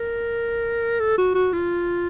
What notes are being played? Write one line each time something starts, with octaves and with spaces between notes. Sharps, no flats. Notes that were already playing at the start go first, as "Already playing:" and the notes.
Already playing: A#4
A4
F#4
F#4
F4